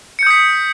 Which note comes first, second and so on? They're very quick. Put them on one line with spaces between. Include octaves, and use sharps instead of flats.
C#7 G6 D#6 B6